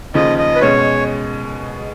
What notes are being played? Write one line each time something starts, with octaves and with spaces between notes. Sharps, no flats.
D#2 C#3 F3 D#5
D#5
B4
B2 G#3 C#4 C#5